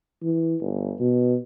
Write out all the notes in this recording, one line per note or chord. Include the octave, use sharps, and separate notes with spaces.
E3
G1
B2